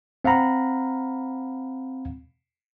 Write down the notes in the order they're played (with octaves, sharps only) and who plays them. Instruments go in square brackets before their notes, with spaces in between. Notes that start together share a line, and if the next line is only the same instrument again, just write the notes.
[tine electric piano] C4 F5 F#5 A#5 B5